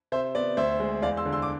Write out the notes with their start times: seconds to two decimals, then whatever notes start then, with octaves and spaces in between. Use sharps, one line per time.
0.12 C3 C5 E5
0.35 B3 D5
0.57 D2 C5 E5
0.80 G#3
1.02 E2 D5 F5
1.17 C6 E6
1.25 D3
1.32 C6 E6
1.42 D6